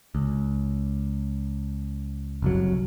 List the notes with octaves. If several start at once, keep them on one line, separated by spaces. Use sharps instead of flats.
C#2
F#1 C2 F#3